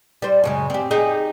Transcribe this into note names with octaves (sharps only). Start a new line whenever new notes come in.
G3 C5
F#2 C#3 G#3
C4 G4
D#4 G4 G#4